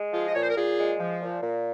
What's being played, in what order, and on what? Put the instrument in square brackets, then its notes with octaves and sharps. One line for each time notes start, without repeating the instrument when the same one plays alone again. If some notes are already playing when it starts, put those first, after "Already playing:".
Already playing: [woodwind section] G#3
F3 F4 G#4
D#5
A#2 C#5
C5
A#4
A#2 F4 G#4
G#3
F3
A#2
A#2